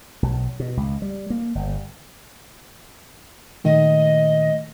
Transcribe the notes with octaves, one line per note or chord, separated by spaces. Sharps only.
B1
B2
C#2
G3
A#3
G1
A#2 D#3 A3 D#5